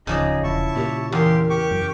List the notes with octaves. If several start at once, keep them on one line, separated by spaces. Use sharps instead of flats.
D1 C#3 F3 D#4 G#4 D5 D#5
E1 E4 A5 C#6
A#2 G4
E2 G4 A#4 F5 C6
G4 C#6 D6
F#2